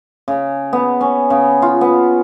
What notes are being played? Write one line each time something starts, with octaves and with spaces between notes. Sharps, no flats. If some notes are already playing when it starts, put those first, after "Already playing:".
C#3
B3
C#4
C#3
F4
B3